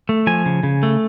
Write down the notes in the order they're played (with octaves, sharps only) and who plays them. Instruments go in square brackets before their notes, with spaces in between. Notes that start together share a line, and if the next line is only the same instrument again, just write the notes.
[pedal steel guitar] A3
F3 G#5
C#3
C#3
A3